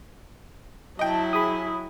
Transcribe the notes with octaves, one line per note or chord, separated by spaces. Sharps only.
F#3 E4 D#5 G5 A5
G#4 B5 D#6